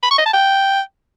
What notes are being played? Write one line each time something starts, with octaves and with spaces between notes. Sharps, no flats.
B5
C#6
D#5
A5
G5